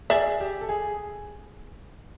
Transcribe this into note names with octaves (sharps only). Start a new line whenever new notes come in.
G#4 D5 E5
G4
A4
G#4